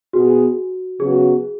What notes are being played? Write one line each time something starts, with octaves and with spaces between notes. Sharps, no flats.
B2 B3 F#4 G#4
C#3 F#3 B3 F#4 G#4